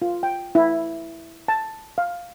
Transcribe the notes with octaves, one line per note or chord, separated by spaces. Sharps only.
F4
G5
E4
A5
F5